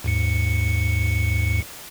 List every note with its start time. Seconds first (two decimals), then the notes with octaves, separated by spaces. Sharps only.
0.04 D#2 G#2 C#7